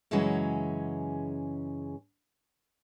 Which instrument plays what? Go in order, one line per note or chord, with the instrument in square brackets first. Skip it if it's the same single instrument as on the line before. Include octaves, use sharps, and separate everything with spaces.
[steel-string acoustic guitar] F#2 C#3 E3 F#3 G#3 C#4